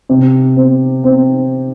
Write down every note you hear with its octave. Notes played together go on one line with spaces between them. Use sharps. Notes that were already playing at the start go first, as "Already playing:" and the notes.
C3
C4
C4